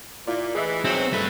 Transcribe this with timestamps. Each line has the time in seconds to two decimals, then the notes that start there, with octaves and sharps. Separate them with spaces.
0.27 A#2 E4 F4 D5
0.55 A2 E3 G#4 D#5 E5
0.84 G#2 B2 F#3 C4
1.13 G3 A3 B4